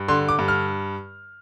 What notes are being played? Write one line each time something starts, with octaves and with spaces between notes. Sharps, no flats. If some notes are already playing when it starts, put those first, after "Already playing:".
Already playing: G2
D3 C6
D6
G2
F6